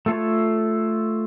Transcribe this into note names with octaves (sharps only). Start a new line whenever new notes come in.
A3 F4 A4 C#5